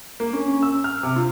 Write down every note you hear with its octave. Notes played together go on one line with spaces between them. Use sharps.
A#3
C#4
C#4
E6
F6
C3
F4